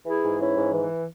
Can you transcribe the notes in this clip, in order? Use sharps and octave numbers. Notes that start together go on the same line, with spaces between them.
E3 E4 G#4
G#2
E3 C#4 E4
G#2
E3